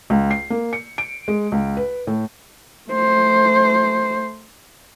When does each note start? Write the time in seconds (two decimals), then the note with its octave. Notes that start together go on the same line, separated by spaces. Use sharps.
0.10 C#2
0.31 C7
0.50 A#3
0.73 C#7
0.98 D7
1.28 G#3
1.52 C#2
1.77 B4
2.07 A2
2.89 A3 C5